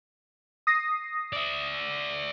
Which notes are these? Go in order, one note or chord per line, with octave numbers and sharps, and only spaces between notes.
D#6 A#6 C7
D5 E5